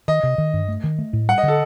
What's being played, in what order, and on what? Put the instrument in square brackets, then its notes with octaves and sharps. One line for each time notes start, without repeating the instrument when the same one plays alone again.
[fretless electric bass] D#3 [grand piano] D#5
[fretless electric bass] C3
D#3
G2
A3
D#3
A3
A2
[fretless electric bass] G3 [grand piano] F#5
[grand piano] D#5
[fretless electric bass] D3 [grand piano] A4